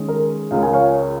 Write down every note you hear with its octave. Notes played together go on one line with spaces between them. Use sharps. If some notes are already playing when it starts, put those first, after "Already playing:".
Already playing: D#3 G#3 C#4 G#4
A#4
C#2 C#3 G#3 F4 A#4 F5
G#5
C#5 F5